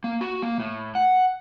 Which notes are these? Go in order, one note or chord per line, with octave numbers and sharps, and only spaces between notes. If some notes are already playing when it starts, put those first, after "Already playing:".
A#3
F#4
A#3
A2
F#5